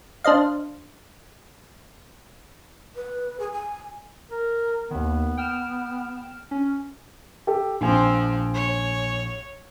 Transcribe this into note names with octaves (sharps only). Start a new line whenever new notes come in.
D4 C5 D#5 F5
B4
G#4
G#5
A#4
D#2 D#3 B3
G5 F6 E7
C#4
G4 A4
A#1 F3 C4 G#5
C#5